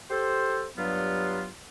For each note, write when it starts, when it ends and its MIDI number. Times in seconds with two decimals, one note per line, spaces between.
0.10 0.66 67
0.10 0.66 69
0.10 0.66 72
0.77 1.46 43
0.77 1.46 54
0.77 1.46 59
0.77 1.46 65